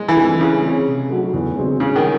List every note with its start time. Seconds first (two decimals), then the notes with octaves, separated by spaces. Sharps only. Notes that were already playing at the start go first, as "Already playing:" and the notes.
Already playing: G#3
0.08 E3
0.17 D#3 A3 C4 D#4
0.40 C#3 E3
0.63 C4 E4 G#4 C#5
0.87 C3
1.10 F#3 A3 D#4 F#4
1.34 E2
1.57 C#3 G#3 C4 F#4
1.80 A2 C#3
1.96 D#3